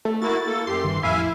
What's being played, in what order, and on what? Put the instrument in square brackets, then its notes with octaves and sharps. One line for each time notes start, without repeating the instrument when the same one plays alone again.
[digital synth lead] A3
[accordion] A#3 E4 F#4 [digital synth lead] A6
[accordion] A#3 A4
[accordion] F#2 G4 [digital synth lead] C6
[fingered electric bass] G2 D#3 [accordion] E3
[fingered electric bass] A1 F2 [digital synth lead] E4 [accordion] E5 F5 G#5